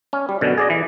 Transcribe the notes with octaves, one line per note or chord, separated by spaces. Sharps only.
C#4
G3
F#2 B2 D3
G#4 D5 D#5
E3